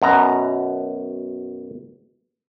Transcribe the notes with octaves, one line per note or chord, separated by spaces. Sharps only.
F#2 B2 A#5